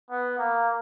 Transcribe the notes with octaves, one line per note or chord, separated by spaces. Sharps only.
B3
A#3